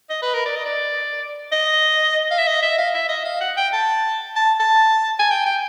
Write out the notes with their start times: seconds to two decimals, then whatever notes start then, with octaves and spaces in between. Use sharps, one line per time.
0.10 D#5
0.22 B4
0.34 A#4
0.46 D5
0.56 D#5
0.65 D5
1.52 D#5
2.31 F5
2.38 E5
2.47 D#5
2.63 E5
2.78 F5
2.94 E5
3.09 D#5
3.25 F5
3.41 F#5
3.57 G5
3.73 A5
4.36 A5
4.60 A5
5.19 G#5
5.31 G5
5.46 G5